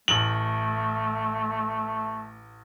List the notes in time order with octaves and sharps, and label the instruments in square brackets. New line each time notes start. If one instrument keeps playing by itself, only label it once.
[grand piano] A1 F#7 [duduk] A3